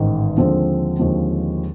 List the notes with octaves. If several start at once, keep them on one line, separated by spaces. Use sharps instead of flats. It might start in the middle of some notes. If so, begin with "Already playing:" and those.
Already playing: A1 G#2 D#3
D#2 D3 F3 G#3 C4
D#2 D3 F3 G#3 C4